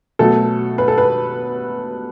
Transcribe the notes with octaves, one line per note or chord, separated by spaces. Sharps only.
B2 F#3 A3 A4
B4
A4
B4